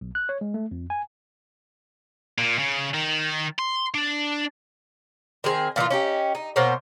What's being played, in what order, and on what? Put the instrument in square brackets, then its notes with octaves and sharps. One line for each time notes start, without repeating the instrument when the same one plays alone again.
[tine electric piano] B1
F#6
C#5
G#3
A3
F2
G#5
[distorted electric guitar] A#2
C#3
D#3
C6
D4
[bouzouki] D#3 C4 G#4
A#2 E3 D4 F4
C#4 D#4 G4
D#4
B2 A#3 C5 C#5